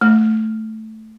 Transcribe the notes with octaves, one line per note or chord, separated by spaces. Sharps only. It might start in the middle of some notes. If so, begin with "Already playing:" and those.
A3